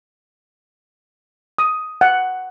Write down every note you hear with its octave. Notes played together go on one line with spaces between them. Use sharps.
D#6
F#5